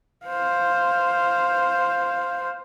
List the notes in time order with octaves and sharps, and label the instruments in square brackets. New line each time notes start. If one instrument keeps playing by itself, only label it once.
[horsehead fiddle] C5 F5